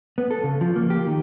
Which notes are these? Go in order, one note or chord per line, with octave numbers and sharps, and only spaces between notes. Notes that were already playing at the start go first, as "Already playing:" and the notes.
B3
A4
C#3
F3
A#3
G4
D#3